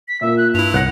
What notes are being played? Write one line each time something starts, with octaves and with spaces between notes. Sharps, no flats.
B6
A#2 A#3 E5
F#6
G2 E4 F7
C2 F#5 F#6 A#6